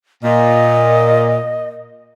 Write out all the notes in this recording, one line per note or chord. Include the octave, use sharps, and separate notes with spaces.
A#2 D#5